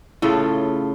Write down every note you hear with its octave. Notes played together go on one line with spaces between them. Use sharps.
A2 C#3 F4 A4